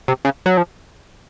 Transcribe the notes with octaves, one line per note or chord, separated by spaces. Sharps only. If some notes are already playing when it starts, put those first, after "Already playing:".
C3
C#3
F#3
F3